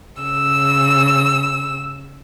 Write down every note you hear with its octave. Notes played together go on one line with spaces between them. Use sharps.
C#3 E6